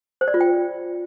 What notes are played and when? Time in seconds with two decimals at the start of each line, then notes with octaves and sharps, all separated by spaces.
0.21 C5
0.28 D5
0.34 F4
0.41 G5